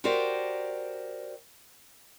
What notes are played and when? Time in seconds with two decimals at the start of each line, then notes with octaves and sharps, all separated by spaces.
0.04 F#4 G4 A#4 C5 D5